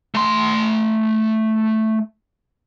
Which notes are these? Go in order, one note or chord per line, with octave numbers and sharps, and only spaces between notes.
A3 C6